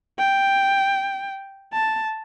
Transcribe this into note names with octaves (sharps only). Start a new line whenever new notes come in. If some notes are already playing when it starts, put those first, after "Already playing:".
G5
A5